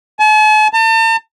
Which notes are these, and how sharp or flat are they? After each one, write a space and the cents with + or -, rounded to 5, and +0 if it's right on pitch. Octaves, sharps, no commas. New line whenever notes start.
A5 -45
A5 +40